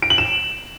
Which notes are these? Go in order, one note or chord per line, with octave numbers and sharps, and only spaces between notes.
D7
F#7
E7